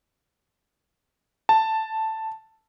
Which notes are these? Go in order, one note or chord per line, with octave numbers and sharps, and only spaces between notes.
A5